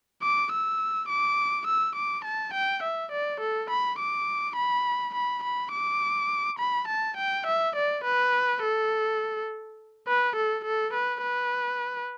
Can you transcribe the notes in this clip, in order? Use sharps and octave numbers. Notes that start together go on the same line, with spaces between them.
D6
E6
D6
E6
D6
A5
G5
E5
D5
A4
B5
D6
B5
B5
B5
D6
B5
A5
G5
E5
D5
B4
A4
B4
A4
A4
B4
B4